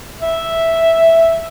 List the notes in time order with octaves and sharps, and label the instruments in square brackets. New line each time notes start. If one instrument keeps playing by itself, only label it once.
[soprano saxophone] E5